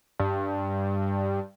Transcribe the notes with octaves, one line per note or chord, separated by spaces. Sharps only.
G2